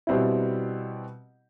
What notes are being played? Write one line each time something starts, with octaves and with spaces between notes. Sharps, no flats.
B2 G3 C4 E4